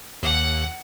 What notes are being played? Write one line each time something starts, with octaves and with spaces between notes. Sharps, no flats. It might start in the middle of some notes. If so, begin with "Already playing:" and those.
D#2 F#5